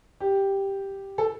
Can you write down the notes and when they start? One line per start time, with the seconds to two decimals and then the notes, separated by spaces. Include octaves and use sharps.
0.20 G4
1.18 A4